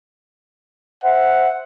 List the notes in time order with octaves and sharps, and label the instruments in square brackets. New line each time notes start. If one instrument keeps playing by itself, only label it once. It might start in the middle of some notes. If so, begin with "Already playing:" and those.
[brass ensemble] C5 E5 F#5